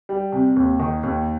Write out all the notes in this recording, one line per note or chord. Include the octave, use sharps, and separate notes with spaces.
G3
C3
D#2
D#3
D#2